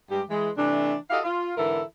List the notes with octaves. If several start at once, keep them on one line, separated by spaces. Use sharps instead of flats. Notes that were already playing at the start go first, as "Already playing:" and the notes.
G2 G#3 G4
E3 G#3
C3 E3 A3 D4
E4 F#4 G4 A4 D#5 F5
F4
G#2 D3 E3 E4 A4 A#4